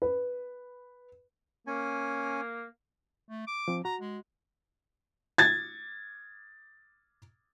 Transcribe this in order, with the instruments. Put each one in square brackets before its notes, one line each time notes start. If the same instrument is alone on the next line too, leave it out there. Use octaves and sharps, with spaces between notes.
[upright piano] B4
[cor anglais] A#3 [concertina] C#4 G#5
[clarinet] A3
D6
[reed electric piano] F3 C4
[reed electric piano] F#4 [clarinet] A#5
[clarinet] G#3
[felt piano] G#6 A6